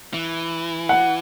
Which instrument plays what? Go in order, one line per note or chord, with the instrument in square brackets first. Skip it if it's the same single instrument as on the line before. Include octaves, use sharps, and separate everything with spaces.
[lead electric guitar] E3
[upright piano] F#5